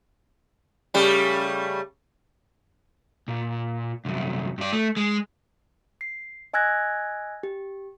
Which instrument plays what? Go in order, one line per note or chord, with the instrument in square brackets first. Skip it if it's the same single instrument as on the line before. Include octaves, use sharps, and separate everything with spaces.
[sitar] C#3 G3 A3
[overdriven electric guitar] A#2
C2 F#2
G2 D5
A3
G#3
[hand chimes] C7
D#5 G#5 E6 F#6 G#6 A#6
G4